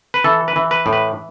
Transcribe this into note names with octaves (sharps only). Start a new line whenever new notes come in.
B4
E3 A4
B4
E3
B4
A2
B4